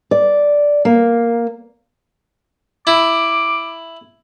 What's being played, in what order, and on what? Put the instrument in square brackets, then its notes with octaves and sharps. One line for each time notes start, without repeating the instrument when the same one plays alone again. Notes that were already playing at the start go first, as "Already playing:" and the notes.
[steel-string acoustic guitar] D5
A#3
[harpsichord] E4 [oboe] D6